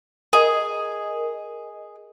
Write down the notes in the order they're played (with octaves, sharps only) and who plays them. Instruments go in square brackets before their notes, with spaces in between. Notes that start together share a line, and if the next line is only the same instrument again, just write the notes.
[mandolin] G#4 [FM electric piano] A#4 D#5